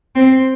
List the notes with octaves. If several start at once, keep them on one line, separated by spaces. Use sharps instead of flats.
C4